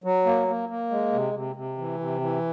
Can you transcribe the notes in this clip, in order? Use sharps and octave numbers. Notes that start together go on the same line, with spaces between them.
F#3
A#3
A#3
A#3
G#3
C3
C3
C3
E3
C3
E3